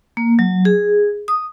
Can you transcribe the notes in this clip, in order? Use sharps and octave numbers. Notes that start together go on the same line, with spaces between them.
A#3
F#3
G#4
D#6